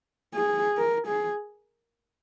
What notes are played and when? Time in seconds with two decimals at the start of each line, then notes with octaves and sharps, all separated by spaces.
0.35 G#4
0.78 A#4
1.07 G#4